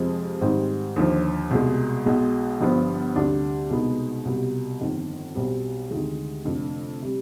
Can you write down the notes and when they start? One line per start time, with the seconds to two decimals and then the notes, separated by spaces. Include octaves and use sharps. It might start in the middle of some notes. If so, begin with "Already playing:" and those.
Already playing: F2 C3 F3 G#3
0.41 G#2 D#3 G3 C4 D#4
0.96 D#2 D3 F3
1.51 C2 B2 G#3
2.06 B1 B2 G#3
2.61 G1 G2 F3 B3
3.16 D2 C3 G3 D4
3.70 C2 B2 G#3 B3 D#4
4.25 C2 B2 G3
4.81 G1 F2 D#3
5.35 B1 B2 G3 C4
5.91 D2 C3 D#3 G#3
6.45 F1 F2 D3
7.02 C3 G3